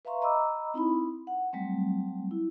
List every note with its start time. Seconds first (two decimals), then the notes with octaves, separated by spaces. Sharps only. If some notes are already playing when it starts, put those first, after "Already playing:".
0.05 B4 E5 F5 A#5 C6 C#6
0.22 D#5 A#5 B5 D6 E6
0.74 C4 D#4 E4 B5
1.27 F#5
1.53 F#3 G3 A3 C4
2.31 E4